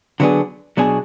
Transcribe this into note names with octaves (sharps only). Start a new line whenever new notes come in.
D3 F#3 B3 D4 G#4
B2 F#3 D4 G#4